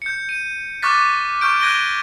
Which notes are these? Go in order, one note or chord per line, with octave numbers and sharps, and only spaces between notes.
G6 C#7
D#7
C#6 D6 F6 F#6 A6 B6
C#6 F6 G6 D7
F#6 G#6 A#6 D7 D#7 G7